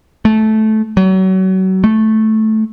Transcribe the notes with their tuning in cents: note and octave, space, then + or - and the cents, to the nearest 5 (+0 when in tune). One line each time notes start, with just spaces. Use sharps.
A3 -15
F#3 +30
A3 -10